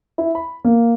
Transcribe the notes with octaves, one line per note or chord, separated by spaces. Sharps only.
E4
B5
A#3